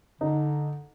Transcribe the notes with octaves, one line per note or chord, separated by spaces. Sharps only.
D3 D#4